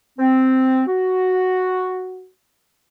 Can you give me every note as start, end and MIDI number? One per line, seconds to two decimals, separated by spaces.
0.19 0.82 60
0.87 2.28 66